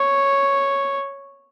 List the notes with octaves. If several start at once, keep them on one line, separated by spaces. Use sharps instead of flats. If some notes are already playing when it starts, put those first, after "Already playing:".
Already playing: C#5